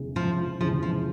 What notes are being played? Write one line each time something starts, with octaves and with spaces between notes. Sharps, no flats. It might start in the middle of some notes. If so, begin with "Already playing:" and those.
Already playing: F1 E2 C#3 E3 G#3
F3
F1 E2 C#3 E3 F3 G#3
F3